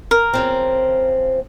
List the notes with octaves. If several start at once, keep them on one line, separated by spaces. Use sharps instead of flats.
A#4
C#3 F3 C4